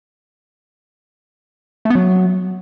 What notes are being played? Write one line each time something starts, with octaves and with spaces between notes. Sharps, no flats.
A3
B3
F#3